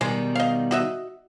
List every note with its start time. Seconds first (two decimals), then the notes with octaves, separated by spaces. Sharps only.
0.01 B2 D#3 G3 G#3
0.35 D#5 F5
0.71 F#4 D#5 E5